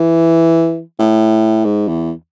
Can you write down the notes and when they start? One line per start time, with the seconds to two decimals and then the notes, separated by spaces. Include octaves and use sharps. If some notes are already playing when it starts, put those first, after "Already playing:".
Already playing: E3
0.99 A2
1.65 G#2
1.88 E2